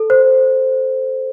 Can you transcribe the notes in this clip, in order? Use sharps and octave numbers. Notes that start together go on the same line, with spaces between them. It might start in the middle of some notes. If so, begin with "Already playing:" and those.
Already playing: A4
C5